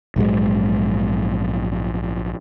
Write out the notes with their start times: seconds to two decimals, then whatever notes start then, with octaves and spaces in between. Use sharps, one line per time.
0.16 A#1 G#2 F#3 G#3